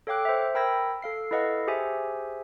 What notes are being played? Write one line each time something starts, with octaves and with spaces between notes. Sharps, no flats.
A4 C#5 F5 G5 D6 F#6
C5 E5
A#4 G5 B5 E6 G#6 A#6
A4 F5 C7
E4 A4 B4 D#5 F5 F#5
G4 G#4 C5 E5 G#5